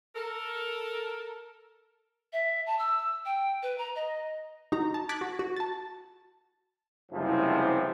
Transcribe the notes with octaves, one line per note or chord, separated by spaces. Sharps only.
A4 A#4
E5
A5
E6
G5
B4
A#5
D#5
D#4 F#4 A#5
A5
D6 F#6 G#6 A6 B6
F#4
F#4
A5 A6
F#1 C2 G#2 C3 E3 F3